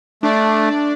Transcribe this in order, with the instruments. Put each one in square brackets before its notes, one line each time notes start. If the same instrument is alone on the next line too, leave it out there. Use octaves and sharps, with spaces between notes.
[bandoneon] A3 [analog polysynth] D4 D5